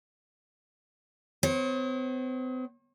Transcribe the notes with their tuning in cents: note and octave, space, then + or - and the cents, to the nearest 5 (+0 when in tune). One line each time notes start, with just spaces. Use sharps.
C4 -45 C#5 -45